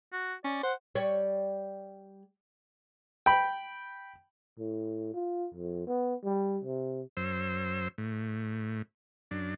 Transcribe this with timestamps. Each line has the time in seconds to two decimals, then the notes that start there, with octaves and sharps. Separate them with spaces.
0.13 F#4
0.45 C#4 D5
0.63 C5 F#5
0.95 G3 C#5
3.26 G5 B5
4.59 A2
5.14 F4
5.54 F2
5.87 B3
6.24 G3
6.64 C3
7.17 F#2 C5 E6
7.98 A2
9.31 F#2 D4